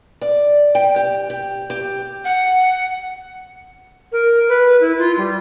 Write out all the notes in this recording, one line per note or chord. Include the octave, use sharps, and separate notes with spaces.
D5
G5
G4
G4
G4
F#5
A#4
B4
E4
F4
G3